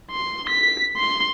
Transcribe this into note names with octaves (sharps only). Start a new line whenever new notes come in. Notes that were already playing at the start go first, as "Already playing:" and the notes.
C6
B6
C6